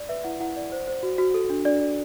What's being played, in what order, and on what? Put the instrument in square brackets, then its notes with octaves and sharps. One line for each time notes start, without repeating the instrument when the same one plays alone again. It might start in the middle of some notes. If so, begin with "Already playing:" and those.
Already playing: [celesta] D5
B4 E5
E4 F#5
E4 F#5
D5
C5
C5
F#4
F#4
A4
D4
D4 D5
D5